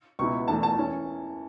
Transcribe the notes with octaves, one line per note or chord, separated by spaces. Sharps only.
C#2 B2 B3 E4 C#6
E1 E2 E3 A3 A5
A5
E3 C#4